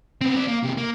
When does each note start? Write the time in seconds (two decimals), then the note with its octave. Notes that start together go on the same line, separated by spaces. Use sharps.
0.21 B3 C4
0.36 C4 D5
0.47 A#3
0.63 A2 C3
0.77 A#3